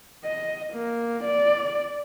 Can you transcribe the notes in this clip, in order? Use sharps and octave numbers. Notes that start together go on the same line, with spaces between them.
D#5
A#3
D5